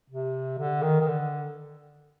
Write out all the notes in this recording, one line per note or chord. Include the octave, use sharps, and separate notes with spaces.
C3
D3
D#3
D#3
D3